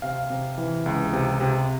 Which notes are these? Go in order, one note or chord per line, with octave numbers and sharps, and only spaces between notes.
C3 F5
C3
E3
C#2
C3
C3